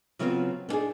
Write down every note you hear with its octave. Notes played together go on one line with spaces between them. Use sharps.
C#3 F#3 G3 B3 C4 F4
B3 D4 D#4 G#4